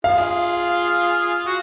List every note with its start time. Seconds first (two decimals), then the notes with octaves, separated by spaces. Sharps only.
0.04 F4 G#4 F5
1.46 F#4